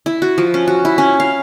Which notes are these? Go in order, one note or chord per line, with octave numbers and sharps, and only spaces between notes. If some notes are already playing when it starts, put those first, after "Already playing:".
E4
F#4
F3
C#4
F#4
E4
C#4
F5